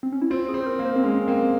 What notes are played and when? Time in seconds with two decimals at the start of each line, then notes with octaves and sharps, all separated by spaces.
0.03 C4
0.12 C#4
0.21 E4
0.30 C4 F4
0.49 G#4
0.54 C4
0.61 C5
0.66 A#4
0.79 A#3
0.85 C5
0.96 C4
1.03 G#3 C#4
1.28 A#3 C4